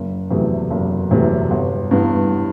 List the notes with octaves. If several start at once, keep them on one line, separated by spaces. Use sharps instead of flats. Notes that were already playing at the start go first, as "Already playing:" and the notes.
Already playing: F#1
E2 C3 F#3 A3
F#1
E2 C3 F#3 A3
G1
G2 E3 B3